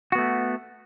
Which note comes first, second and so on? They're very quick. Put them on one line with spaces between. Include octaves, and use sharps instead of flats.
F#4 B3 A3